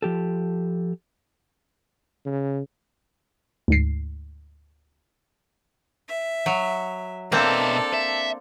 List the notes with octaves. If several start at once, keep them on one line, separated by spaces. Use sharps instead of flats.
F3 G4 A4
C#3
D2 G#2 C7
E5
F#3
B2 A#3 C4 D4 A4 E5 F5
E5